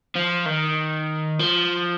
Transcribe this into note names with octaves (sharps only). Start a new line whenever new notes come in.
F3
D#3
F3